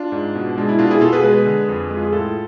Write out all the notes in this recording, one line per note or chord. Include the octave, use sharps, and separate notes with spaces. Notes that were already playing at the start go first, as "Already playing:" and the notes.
Already playing: D4 F4
G#2
B2
G#3 D4
E4
B2 D4 F4
E4 G#4
B2 F4 A4
G#4 B4
G#3 G#4 B4
D3
F2
G#3
F4
G#4
A2 F4 A4